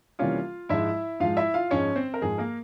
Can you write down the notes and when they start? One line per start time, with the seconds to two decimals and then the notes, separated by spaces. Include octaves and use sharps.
0.19 C3 E3 G3 A#3 C#4 F4 F5
0.69 G#2 F3 G#3 E4 E5
1.20 G#2 F3 G#3 F4 F5
1.37 E4 E5
1.54 F4 F5
1.71 G#2 F3 G#3 C#4 C#5
1.96 C4 C5
2.14 A#4
2.21 G#2 F3 G#3 G#4
2.38 A#3 A#4